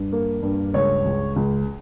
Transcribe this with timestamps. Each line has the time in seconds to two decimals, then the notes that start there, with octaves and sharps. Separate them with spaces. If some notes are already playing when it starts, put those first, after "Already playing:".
Already playing: G2
0.13 A#3
0.42 G2
0.74 C#2 C#5
1.05 C#2
1.36 C#2